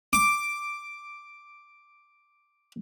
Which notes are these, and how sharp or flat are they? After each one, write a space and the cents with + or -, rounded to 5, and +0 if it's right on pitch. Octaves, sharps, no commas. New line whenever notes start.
D6 +0